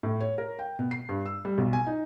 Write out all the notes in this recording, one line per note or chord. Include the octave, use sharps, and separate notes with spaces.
A2
C#5
A#4
G5
B2
C7
G2
E6
G3
B1
G#5
D#4